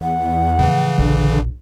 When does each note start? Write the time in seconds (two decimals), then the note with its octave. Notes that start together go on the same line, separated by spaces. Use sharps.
0.01 E2 F#5
0.59 A2 C#3 E3 F3
0.98 E1 A#1 D3